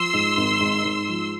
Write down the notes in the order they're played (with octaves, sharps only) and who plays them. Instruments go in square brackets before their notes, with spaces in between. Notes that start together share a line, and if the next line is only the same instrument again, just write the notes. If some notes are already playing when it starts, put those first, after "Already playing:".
Already playing: [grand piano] F3 [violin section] C6 E6
[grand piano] G#2
G#1
G#2
G#2
F3